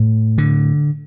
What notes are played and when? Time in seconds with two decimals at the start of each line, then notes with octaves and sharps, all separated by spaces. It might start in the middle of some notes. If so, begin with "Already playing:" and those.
Already playing: A2
0.38 D3